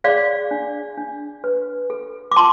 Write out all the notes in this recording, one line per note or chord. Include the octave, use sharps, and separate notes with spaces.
G#4 D5 F5
D4
D4
B4
A4
D6
F4 A5 C6